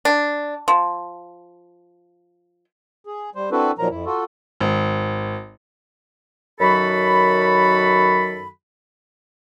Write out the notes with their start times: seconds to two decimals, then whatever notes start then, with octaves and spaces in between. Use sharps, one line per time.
0.05 D4
0.68 F3
3.05 G#4
3.35 G3 C5
3.52 C4 D4 E4 F#4 A4 B4
3.79 A#2 D#3 F3 F#3 A#4 A#5
3.90 F2 E4
4.06 F4 F#4 A4
4.60 G#1
6.60 F#2 D#3 F#3 F#4 A4 B5